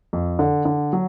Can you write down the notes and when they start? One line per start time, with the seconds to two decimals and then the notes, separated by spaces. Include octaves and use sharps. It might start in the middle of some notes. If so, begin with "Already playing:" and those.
0.13 F2
0.39 D3
0.65 D3
0.93 F#3